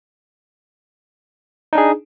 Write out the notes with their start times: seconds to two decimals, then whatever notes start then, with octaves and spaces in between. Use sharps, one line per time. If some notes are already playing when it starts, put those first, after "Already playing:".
1.73 D#4
1.75 D4
1.78 G#4